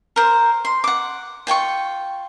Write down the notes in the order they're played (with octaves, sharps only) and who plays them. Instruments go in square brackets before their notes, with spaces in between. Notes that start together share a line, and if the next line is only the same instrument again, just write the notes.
[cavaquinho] A#4 C5
C6
F#5 D6
F4 G5 G#5 C#6